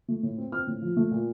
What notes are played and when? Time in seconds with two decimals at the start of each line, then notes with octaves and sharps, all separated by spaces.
0.08 A3
0.23 A2
0.38 C4
0.52 C4 F6
0.67 A2
0.82 F3
0.97 A3
1.11 A#2